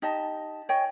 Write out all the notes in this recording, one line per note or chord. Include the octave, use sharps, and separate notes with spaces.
D#4 G4 D#5 A5
C#5 D#5 G5 G#5